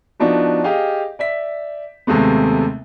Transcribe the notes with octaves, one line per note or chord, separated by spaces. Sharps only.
F3 B3 D4 D#4 F#4
G4 G#4 D#5 F5
D5 E5 B6
D#2 C3 G#3 A3 B3